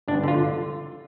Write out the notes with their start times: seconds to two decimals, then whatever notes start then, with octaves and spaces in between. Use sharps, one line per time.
0.08 G1 D4
0.24 D3 F4